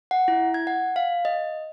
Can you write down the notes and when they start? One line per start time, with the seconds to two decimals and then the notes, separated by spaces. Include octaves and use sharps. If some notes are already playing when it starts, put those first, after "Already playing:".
0.11 F#5
0.28 E4
0.54 G#6
0.67 F#5
0.96 F5
1.25 D#5